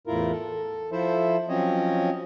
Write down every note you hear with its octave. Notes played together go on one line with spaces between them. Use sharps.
E2 A2 E4 F4 A#4
A4
F3 E4 A4 C5 E5
F3 F#3 C4 C#4 C#5 D#5